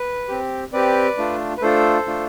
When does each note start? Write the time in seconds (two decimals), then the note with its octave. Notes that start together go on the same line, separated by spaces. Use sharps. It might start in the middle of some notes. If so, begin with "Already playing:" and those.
Already playing: B4
0.28 C4 G4
0.73 C4 G4 B4 D5
1.17 A3 D4 F4
1.57 B4
1.62 A3 D4 F4 A4 C5
2.07 A3 D4 F4